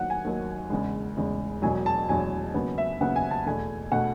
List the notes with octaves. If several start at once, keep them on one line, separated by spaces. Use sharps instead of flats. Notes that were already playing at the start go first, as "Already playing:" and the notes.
Already playing: D#2 D#3 F#3 F#5
G#5
D#2 D#3 F#3
E2 C#3 G#3
E2 C#3 G#3
E1 E2 B2 F#3 G#5
A5
E1 E2 B2 F#3 G#5
D#2 C#3 F#3 B3
E5
D#2 C#3 F#3 B3 F#5
G#5
A5
E2 B2 A3 G#5
B2 A3 F#5